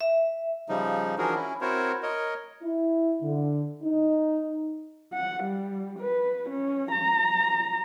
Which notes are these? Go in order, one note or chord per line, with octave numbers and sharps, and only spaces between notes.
E5
C#3 F3 G3 D#4
E3 F3 D4 F#4 G#4 A#4
C#4 E4
C4 E4 F#4 A#4 C5 C#5
A#4 C#5 D#5
E4
D3
D#4
F#5
G3
B4
C#4
A#5